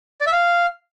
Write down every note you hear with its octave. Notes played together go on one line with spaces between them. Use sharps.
D5
E5
F5